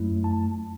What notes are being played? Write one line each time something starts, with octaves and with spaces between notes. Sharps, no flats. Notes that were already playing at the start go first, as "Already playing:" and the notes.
Already playing: F#2 F#3 A3 E4
A5